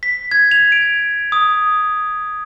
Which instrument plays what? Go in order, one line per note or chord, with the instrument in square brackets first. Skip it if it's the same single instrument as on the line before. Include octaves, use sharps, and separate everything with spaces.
[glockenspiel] B6
G#6
F7
D7
D#6